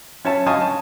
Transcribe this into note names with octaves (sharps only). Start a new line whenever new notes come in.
C#4 C#5 E5 A5
D#5 F5 G#5 A5 C#6 D#6
A5